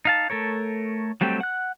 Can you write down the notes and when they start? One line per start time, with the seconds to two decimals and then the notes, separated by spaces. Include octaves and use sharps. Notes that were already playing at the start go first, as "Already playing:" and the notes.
0.05 D#4 F5 A5
0.30 A3 A4 A#4 C#5
1.21 F#3 G3 A3 C4 G4
1.40 F#5 F#6